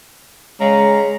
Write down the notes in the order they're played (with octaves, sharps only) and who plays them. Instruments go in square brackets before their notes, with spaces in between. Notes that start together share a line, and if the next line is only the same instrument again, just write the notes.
[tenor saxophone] C#3 [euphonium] G#3 [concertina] A#5